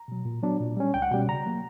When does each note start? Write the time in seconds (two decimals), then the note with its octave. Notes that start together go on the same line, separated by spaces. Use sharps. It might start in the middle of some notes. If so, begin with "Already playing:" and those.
Already playing: A#5
0.08 B2 F#3
0.25 A#2
0.43 F#3 B3 D4
0.60 A#2
0.77 G3 C#4
0.94 C#2 G5
1.02 F#5
1.11 B2 G3 C#4 G5
1.28 C#3 A#5
1.46 F#3 A#3